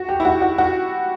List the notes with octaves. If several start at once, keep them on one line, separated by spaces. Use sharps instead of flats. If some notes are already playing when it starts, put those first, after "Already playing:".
Already playing: F#4
G4
E4
F#4
F#4
F#4